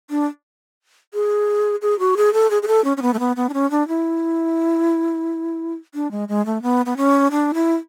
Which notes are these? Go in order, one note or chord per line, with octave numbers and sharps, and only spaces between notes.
D4
G#4
G#4
F#4
G#4
A4
G#4
G#4
A4
C#4
C#4
B3
A3
B3
B3
D4
C#4
D4
E4
D4
G#3
G#3
A3
B3
B3
C#4
D4
E4